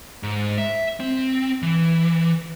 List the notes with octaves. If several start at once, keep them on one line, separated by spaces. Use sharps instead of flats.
G#2
E5
C4
E3